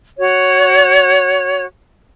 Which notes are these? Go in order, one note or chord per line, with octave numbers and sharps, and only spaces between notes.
F#4 C#5